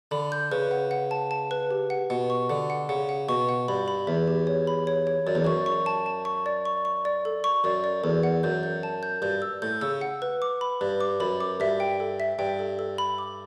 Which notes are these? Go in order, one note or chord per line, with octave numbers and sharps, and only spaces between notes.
D3 B5
G6
C#3 B4
F#5
F#5
A5
A5
B4
G4
F#5
B2 F#5
C#6
D3 F#5
F#5
C#3 F#5
F#5
B2 C#6
F#5
G2 B5
B5
E2 E5
G4
C#5
B5
C#5
C#5
F#2 D5
E2
F#2 C#6
C#6
A5
A5
C#6
D5
C#6
C#6
D5
A4
C#6
F#2 D5
D5
E2 A4
F#5
F#2 G6
G6
A5
G6
G2 G6
E6
A2 G6
C#3 E6
F#5
B4
D6
B5
G2 B4
D6
F#2 B5
D6
G2 E5
G5
A4
E5
G2 G5
A4
A4
B5
D6